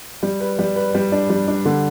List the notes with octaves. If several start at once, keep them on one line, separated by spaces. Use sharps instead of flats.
G3
B4
G3
B4
G3
D4
G3
D4
D3